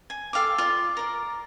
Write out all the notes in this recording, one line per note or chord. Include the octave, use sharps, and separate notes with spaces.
G#5
A4 F5 G5 D6
F4 D5
A#4 D5